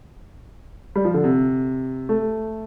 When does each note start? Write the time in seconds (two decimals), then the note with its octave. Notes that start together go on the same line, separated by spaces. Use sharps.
0.96 G3
1.05 F3
1.14 D3
1.24 C3
2.09 A3